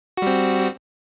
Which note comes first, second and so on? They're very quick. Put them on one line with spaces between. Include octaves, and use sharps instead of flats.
F#4 G3 C4